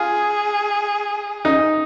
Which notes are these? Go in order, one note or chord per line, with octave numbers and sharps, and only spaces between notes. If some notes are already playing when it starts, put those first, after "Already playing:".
Already playing: F4 G#4
D#4